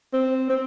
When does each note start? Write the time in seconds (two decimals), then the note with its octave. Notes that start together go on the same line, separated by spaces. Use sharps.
0.13 C4
0.50 C4